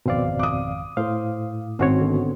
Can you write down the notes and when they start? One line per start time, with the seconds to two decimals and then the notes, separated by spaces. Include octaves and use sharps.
0.06 G#1 F2 B2 C4 D5 F5
0.39 D6 D#6
0.97 A2 C5 F5
1.79 G#1 C4 C#4 F#4 C#5
2.01 D3 B3